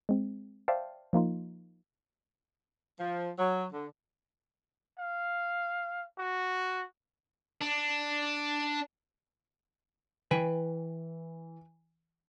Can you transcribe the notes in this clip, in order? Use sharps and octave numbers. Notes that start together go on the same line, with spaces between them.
G#3 C4
C5 D5 E5 F5 G5 A5
F3 A#3 D#4 F4
F3
F#3
D3
F5
F#4
D4
E3 B4 G5 G#5